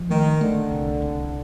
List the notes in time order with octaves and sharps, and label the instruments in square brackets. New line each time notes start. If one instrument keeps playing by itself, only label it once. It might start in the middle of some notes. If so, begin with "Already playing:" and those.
Already playing: [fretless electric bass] F3
[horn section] D#3 [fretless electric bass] A3
[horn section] D3 [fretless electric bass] A3
[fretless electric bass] C2
C2